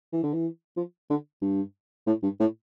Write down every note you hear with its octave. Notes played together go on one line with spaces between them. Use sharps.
E3
D3
E3
F3
D3
G2
A2
G2
A2